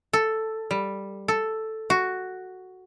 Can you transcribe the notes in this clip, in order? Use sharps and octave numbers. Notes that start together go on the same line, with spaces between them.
A4
G3
A4
F#4